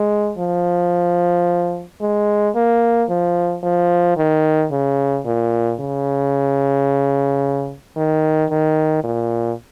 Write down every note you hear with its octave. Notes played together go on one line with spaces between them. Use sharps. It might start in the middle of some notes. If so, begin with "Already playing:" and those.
Already playing: G#3
F3
G#3
A#3
F3
F3
D#3
C#3
A#2
C#3
D#3
D#3
A#2